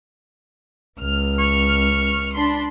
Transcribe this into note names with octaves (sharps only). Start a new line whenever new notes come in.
C#2 F6
C#6
D4 B5 C6